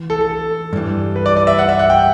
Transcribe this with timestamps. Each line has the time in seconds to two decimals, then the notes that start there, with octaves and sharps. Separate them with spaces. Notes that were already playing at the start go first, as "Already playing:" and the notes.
Already playing: E3
0.10 A4
0.21 A4
0.73 G2 E3 G3
1.16 B4
1.26 D5
1.37 D5
1.47 E5
1.59 F#5
1.69 E5
1.79 F#5
1.90 G5